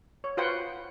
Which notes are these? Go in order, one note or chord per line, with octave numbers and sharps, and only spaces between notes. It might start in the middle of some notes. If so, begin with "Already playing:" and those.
C#5
F4 F#4 B4 C5 F#5 G5